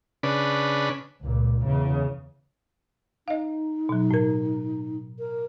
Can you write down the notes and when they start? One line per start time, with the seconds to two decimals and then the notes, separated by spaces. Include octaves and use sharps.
0.23 C#3 D4 B4
1.22 C#2 A#2
1.65 E2 C#3
3.28 D#4 D#5 F5
3.89 B2 F#3
4.11 A2 A#4
5.19 A#4